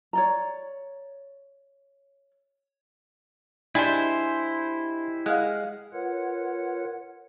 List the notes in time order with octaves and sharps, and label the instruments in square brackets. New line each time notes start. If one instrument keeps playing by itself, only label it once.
[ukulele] C#5 D5 A#5
[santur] G#3 G4 [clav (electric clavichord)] D4 G#5 [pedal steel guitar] E4 C5
[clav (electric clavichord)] G#3 [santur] D#5 F5 F#5
[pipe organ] F4 A#4 B4 C#5 F#5